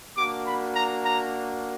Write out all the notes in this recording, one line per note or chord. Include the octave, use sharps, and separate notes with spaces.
A#3 D4 F#4 D6
B5
A#5
A#5